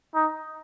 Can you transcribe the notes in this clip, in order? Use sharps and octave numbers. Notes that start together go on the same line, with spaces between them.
D#4